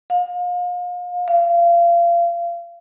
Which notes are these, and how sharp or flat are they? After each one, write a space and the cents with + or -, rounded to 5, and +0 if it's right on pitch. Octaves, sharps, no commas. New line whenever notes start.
F5 +35
F5 -30